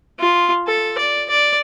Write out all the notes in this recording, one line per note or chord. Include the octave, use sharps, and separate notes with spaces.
F4
A4
D5
D5